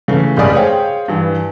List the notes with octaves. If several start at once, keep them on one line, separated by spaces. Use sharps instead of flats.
C#3 E3 A3
F1 C#2 C#3 D5 G#5 D#6
G#4 C5 C#5 F5 G5
G2 E3